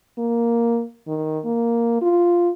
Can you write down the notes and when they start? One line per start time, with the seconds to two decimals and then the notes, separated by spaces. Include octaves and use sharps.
0.18 A#3
1.08 D#3
1.45 A#3
2.01 F4